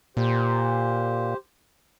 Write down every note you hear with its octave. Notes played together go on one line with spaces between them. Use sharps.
A#2 G4 C5